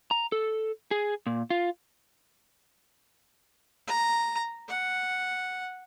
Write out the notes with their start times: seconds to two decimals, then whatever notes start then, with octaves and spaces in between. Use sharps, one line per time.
0.11 A#5
0.32 A4
0.91 G#4
1.27 A#2
1.50 F4
3.87 A#5
4.68 F#5